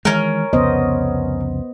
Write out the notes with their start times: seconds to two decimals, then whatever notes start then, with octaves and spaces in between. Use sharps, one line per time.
0.05 D#3 E3 G#3 C#4 A#4
0.53 C2 F2 C#3 B3 C5 D#5